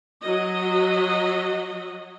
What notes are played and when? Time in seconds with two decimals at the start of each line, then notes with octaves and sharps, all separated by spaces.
0.22 F#3 F#4 D#5